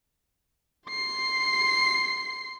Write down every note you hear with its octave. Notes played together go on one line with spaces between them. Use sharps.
C6 C7